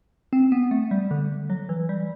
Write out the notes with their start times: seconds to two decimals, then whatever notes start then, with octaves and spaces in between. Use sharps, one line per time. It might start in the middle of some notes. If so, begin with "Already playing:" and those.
0.33 C4
0.52 B3
0.71 A3
0.91 G3
1.11 D3
1.50 F#3
1.69 E3
1.89 G3